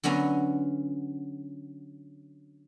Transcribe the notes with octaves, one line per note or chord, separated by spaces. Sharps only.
D3 F#3 B3 C#4 A#5